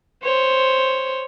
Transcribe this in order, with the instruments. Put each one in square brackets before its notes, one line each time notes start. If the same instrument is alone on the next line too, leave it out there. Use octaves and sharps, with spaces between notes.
[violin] C5 C#5